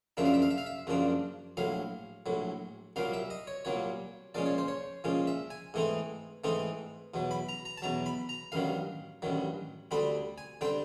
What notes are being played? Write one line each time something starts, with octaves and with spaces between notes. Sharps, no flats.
F#2 C#3 F3 A#3 D4 E5
F5
E5
F5
E5
F5
E5
F#2 C#3 F3 A#3 D4
A#1 A2 F#3 F5
A#1 A2 F#3
C2 A#2 F#3 A#3 F5
E5
D#5
C#5
C2 A#2 F#3 A#3 C#5
A#2 F3 G#3 C#4 D5
C#5
C5
C#5
A#2 F3 G#3 C#4
E5
G#5
G#2 E3 A3 C4 D#4
G#2 E3 A3 C4 D#4
E2 B2 F#3
B5
A#5
A#5
A5
E2 B2 F#3 A#5
B5
A#5
A1 G2 D#3 F#3 F5
A1 G2 D#3 F#3
D2 D3 G3 C4 B5
G#5
D3 G3 C4 G5